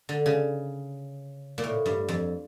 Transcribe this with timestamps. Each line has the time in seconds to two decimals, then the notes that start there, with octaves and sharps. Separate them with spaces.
0.09 D3
0.26 C#3
1.58 A#2
1.64 A2
1.86 G2
2.08 F2